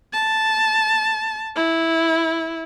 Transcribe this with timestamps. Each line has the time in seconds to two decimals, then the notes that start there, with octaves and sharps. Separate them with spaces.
0.13 A5
1.56 E4